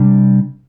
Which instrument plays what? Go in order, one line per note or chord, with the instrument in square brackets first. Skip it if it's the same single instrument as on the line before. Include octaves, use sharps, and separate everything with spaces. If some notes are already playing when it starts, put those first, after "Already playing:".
Already playing: [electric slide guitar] C3 G3 D4